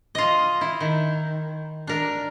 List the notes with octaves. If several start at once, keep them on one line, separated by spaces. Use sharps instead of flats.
F4 D#5
E4
D#3
D4 A#4